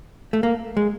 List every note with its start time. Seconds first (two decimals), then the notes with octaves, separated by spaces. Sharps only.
0.33 A3
0.43 A#3
0.77 G#3